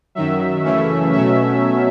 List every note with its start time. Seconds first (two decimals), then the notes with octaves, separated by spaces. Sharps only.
0.15 F#2 D#3 F#3 E5
0.64 F#2 C#3 E3 A3 C#4
1.13 B2 F#3 A3 C#4 E5